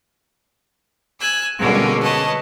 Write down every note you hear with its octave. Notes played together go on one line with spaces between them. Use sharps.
G#5 E6 F#6
B2 D3 G3 G#3 A#3 C#4
B4 C#5 D#5 A5